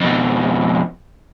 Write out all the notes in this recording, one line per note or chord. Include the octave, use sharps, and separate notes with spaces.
F2 B2